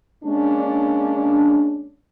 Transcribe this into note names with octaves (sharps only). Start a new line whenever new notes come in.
G#3 A#3 C#4 D4